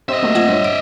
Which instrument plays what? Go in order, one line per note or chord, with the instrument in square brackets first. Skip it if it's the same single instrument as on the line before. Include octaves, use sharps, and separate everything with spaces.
[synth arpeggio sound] C4 G4 C5 [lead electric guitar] D#5 E5
[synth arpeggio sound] A3 A#3 C4 [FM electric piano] F#4 E6
[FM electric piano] F3 [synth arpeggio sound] F#5 G#6 A#6
[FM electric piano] G2 [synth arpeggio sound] C5 C#5
[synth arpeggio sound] D7